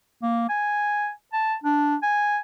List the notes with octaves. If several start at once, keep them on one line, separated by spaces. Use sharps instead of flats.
A#3
G#5
A5
D4
G#5